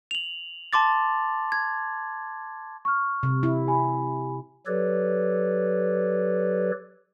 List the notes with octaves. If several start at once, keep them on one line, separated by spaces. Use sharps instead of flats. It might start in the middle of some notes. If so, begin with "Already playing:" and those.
F7 F#7
A5 C6 D6 A6
G#6
C#6 F6
C3
E4
G4 G#5 B5
F#3 G4 A4 B4 C#5 D5